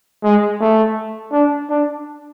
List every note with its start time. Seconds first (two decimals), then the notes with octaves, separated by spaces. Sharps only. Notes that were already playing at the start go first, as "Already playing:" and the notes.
0.24 G#3
0.61 A3
1.33 D4
1.70 D4